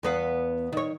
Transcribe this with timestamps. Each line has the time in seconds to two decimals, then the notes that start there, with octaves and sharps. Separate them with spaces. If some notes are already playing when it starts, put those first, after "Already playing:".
0.03 E2 B3 F5
0.72 D#3 C#5